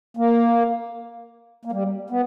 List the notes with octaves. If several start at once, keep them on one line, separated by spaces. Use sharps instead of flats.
A#3
A#3
G3
B3